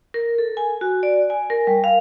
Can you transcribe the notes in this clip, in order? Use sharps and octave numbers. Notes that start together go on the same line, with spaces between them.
A#4
A4
G#5
F#4
D5
G#5
A#4
G3
F5